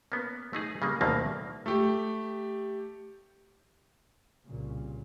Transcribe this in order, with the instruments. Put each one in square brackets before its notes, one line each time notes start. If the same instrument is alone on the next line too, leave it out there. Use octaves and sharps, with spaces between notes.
[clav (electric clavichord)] A#3 B3 C#4
A3 D#4 G#4
C#3 G3 G#3 A#3
D2 B2 D#3 A3 A#3 C4
[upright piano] A3 G4
[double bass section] C2 A#2 C#3